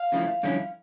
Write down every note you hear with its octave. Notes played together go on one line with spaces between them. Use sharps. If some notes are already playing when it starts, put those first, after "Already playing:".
Already playing: F5
C#3 F3 A3 E4
G2 D3 F3 C#4 E4